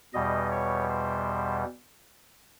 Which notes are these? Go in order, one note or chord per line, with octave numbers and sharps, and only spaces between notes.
E2 B2 G3 D#5
C#5
C5